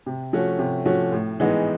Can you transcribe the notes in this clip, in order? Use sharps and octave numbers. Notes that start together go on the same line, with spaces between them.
C3
F3 A3 C#4 F#4
C3
F3 A3 C#4 F#4
A2
E3 G#3 B3 D#4